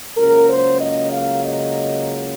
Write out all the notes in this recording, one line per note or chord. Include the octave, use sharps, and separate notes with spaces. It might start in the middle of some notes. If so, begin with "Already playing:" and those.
C#2 C#3 F#3 A#3 A#4
C5
D#5
F5
D#5